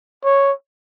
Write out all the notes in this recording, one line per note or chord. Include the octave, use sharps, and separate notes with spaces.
C#5